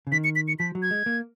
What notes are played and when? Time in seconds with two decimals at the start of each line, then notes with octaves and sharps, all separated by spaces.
0.07 C#3
0.12 D#3 B6
0.24 C#7
0.36 B6
0.48 C#7
0.59 F3 B6
0.75 F#3
0.82 G#6
0.91 G#3
1.06 A#3